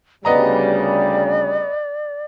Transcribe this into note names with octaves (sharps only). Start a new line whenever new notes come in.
D2 C#3 G3 B3 D5 D#5 A#5